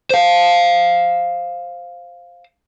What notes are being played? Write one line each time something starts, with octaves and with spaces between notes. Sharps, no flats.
C5 F5